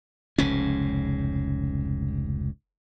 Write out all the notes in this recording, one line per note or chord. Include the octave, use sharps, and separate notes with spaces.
F1 C#2 G#2 C#4